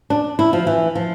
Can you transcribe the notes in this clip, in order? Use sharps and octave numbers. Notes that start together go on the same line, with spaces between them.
D4
E4
F3
E3
F3